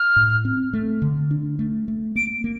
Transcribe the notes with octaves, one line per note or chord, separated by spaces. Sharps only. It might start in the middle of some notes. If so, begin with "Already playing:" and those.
Already playing: F6
A2
C4
A3
D3
D4
A3
A3
A#3 D7
A#3